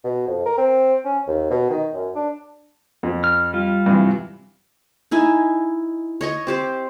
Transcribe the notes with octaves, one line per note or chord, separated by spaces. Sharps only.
B2
F2
A#4
C4
C#4
D#2
B2
D#3
F#2
D4
F2
F6
G3 F4
G2 C3 E3
D#4 E4 G#5
C#5 D#5 C#6
C4 G4 C5